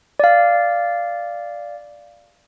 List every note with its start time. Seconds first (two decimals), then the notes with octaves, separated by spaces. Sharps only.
0.20 D5 F5